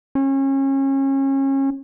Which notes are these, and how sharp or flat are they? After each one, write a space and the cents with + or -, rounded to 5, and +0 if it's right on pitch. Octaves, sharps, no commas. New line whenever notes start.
C#4 -30